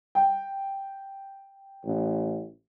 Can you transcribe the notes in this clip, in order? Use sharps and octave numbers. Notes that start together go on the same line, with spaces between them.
G5
A1